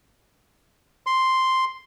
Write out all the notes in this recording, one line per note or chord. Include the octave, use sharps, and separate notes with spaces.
C6